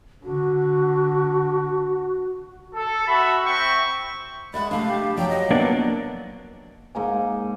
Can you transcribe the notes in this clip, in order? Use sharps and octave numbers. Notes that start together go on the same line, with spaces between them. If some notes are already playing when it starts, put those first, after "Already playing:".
D3 F#4
A4
F#4 E5 B5
C4 E5 G5 C#6
G#3 D5 E5 F#5 B5
C3 A3 D4 F5
G4
F3 F#3 D5 G5
D#5
A#3 B3 D4
G#2 A#3 G#5